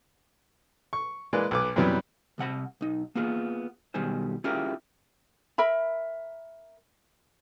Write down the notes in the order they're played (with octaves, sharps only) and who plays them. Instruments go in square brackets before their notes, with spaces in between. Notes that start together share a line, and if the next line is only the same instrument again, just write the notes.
[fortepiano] C#6
E3 G#3 A#3 B4 D5
B1 B4 D6
F#2 C3 E3 F#3 G3 B3
[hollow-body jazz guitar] C2 C3 F#5 B5
B1 D#4
A#3 B3 F4 G#4
B1 B2 D#3 G3 G#4 C5
C#4 E4 F4 G4 G#4 A#4
[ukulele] A#4 E5 B5